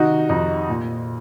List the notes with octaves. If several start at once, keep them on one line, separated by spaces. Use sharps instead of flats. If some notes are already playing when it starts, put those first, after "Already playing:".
Already playing: C3 D#3 D#4 F#4
F2 D#4
A#2